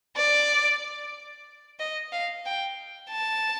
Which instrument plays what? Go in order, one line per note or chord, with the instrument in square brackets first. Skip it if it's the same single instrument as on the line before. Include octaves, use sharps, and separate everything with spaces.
[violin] D5
D#5
F5
G5
A5